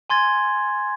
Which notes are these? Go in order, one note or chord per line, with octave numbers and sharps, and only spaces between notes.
G#5 C6 G#6 A6